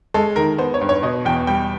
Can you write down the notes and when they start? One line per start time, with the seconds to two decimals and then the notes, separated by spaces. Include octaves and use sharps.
0.14 G#3 A4
0.36 D#3 A#4
0.58 B3 C5
0.74 C#5
0.81 G2
0.89 C#5
1.03 B2 D#5
1.25 E2 G5
1.47 G3 G5